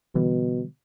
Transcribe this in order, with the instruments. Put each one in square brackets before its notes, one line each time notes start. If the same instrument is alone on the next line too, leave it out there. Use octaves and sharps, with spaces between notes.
[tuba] B2 [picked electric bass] D3 E3 G3